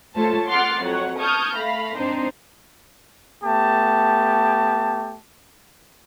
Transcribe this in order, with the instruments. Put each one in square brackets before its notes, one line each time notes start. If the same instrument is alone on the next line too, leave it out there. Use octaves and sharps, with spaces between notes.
[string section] A3 F4 A4 C5 C#5 A5
F#5 C6 D6 F6 A6 C7
F2 F#3 C#5 F#5
A5 C#6 D#6 F6 G6 G#6
A3 F5 B5 A#6
C4 D4 D#4 C5
[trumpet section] A3 B3 G4 A5